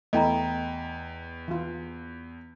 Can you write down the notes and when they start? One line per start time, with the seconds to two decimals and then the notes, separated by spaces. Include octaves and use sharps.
0.13 E2 A3 E4 D#5 G5 A#5
1.48 E3 F4